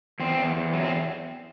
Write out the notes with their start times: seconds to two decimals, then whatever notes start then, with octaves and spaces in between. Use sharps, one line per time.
0.20 E2 C4
0.38 E2
0.56 E2
0.73 F#3
0.83 C4